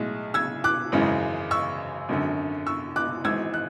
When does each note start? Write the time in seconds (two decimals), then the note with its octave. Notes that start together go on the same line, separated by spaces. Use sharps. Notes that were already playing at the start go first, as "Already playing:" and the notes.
Already playing: B1 A2 G#3
0.34 E6 G#6
0.64 D6 F#6
0.92 G#1 F#2 C#3 E3 G#3
1.51 C#6 E6
2.09 G#1 F#2 D3
2.66 C#6 E6
2.96 D6 F#6
3.24 G#1 G#2 E3 E6 G#6
3.54 F#6